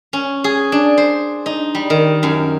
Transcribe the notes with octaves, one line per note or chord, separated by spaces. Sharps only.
C#4
G#4
D4
C5
D#4
G3
D#3
F#2